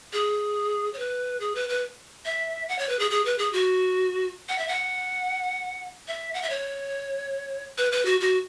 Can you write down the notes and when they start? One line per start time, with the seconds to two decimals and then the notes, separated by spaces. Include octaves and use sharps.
0.13 G#4
0.94 C#5
0.99 B4
1.40 G#4
1.55 B4
1.69 B4
2.25 E5
2.69 F#5
2.79 C#5
2.89 B4
2.99 G#4
3.11 G#4
3.25 B4
3.38 G#4
3.53 F#4
4.49 F#5
4.58 E5
4.68 F#5
6.08 E5
6.34 F#5
6.42 E5
6.50 C#5
7.78 B4
7.92 B4
8.06 F#4
8.20 F#4